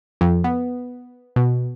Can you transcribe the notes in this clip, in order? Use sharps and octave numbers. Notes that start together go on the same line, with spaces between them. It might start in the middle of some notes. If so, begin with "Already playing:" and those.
F2
B3
B2